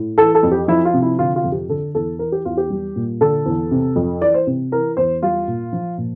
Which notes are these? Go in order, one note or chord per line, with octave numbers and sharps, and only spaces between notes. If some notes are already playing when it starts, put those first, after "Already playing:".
Already playing: A2
E3 A4
A4
F2
G4
F3 E4
F4
C3
E4
D3 F4
F4
F2
G4
D3 A4
E2 A4
E3 A#4
G4
E2 F4
G4
G3
A#2
D3 A4
E2
C3
F2
E3 D5
C5
C3
E3 A#4
E2 C5
G3 F4
A#2
F3
A#2